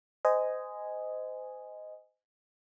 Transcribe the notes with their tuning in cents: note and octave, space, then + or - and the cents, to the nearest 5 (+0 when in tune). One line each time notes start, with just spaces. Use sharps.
C5 -30 D#5 +0 G#5 +0